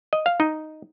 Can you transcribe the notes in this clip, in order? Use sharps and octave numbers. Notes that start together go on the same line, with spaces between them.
D#5
F5
D#4 D#5